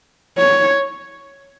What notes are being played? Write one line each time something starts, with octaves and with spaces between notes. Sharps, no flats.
C#5